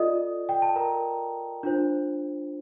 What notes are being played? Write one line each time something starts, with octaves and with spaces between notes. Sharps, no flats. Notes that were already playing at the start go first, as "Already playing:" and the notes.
Already playing: F4 A4 D5 D#5 D#6
G5
A5
A#4 A#5
D4 F4 C5